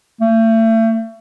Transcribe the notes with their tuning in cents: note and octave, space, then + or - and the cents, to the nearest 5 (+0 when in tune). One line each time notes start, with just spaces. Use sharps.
A3 +35